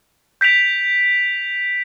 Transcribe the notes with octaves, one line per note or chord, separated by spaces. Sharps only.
G6 B6 D7 F7